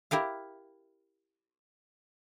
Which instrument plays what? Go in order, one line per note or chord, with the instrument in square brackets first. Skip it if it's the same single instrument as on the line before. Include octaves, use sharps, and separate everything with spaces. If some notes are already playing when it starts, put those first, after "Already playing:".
[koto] E4 G4 A#4 F5